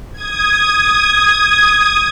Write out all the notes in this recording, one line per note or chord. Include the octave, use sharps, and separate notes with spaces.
D#6 G#6